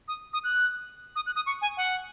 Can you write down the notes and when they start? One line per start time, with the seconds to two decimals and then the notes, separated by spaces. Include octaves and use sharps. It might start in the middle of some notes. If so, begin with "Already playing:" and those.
0.08 D#6
0.33 D#6
0.44 F#6
1.16 D#6
1.26 F#6
1.36 D#6
1.46 C#6
1.62 G#5
1.77 F#5